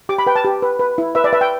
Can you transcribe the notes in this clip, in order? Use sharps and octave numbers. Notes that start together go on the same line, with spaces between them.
G4 D6
B5
B4 G5
A5
G4
B4
B4
E4
B4 E5
D5
B4 E5
G5